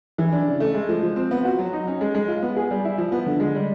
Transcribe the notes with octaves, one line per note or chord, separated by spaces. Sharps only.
E3
D4
C#3
A3
G#3
F3
F3
C4
B3
F#4
F#3
D#4
C#4
G#3
G#3
F4
B3
G#4
G3
E4
F3
B3
D3
G#3
G3